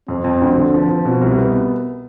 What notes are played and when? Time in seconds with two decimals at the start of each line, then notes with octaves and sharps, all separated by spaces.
0.08 F2 C4
0.24 F2
0.42 D2
0.57 D3
0.74 F3
0.89 F3
1.05 B2 C4
1.21 C2
1.38 B3